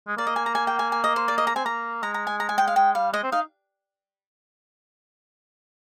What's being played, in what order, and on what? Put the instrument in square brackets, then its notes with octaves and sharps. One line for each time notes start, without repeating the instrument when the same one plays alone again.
[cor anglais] G#3
[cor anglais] A#3 [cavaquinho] D5
[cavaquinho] D#5
G#5
A#5
G#5
G5
G#5
G#5
D#5
C5
D5
D#5
A#5
[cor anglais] C4 [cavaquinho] G#5
[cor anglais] A#3 [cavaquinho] A#5
[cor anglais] G#3 [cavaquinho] A#5
[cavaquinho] A#5
G#5
A#5
G#5
G5
F5
[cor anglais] G#3 [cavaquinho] G5
[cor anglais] G3 [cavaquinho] F5
[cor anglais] G#3 [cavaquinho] D#5
[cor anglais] C4
[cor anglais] D#4 [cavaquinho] F5